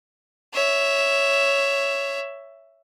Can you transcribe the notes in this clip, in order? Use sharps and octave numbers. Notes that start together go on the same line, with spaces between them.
C#5 E5